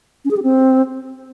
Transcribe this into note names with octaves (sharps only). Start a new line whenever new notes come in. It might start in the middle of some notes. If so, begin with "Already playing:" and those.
C#4
G#4
G4
C4